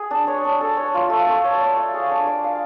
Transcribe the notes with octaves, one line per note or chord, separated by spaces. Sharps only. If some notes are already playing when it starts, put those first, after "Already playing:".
Already playing: G#4
D4
C#5
D4
A4
C#5
F4
A3
A4
C#5
D5
F5
G#4
D4
D5
F5